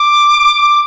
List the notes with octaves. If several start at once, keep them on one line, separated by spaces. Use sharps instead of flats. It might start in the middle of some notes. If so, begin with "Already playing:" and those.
Already playing: D6